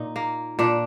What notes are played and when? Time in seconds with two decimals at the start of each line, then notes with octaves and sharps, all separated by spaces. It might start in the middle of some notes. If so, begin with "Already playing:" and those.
Already playing: A#2 D#4
0.16 A#3
0.59 A#2 D4